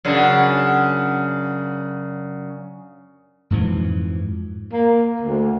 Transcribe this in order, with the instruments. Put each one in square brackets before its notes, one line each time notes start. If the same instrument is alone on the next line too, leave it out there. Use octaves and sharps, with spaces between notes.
[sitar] F#2 C#3 D4
[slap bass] F2 G#2 E3 F3
[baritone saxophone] A#3
D2